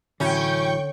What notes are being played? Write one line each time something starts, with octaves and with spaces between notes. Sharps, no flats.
A1 D3 F#3 C#4 E4 G5 C#6 G6